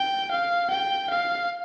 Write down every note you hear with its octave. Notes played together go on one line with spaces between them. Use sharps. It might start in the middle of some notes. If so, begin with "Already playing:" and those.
Already playing: G5
F5
G5
F5